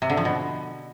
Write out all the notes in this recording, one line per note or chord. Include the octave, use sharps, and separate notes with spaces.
C3
D3
F3
B2